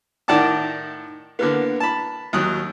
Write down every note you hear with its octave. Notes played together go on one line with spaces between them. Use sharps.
A2 D#3 D5 F#5 A5 D6
D3 A#3 B3
A5 B5
D#2 F#3 D#6 F#6